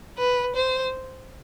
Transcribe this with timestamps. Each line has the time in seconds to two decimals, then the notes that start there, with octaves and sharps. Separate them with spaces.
0.18 B4
0.56 C5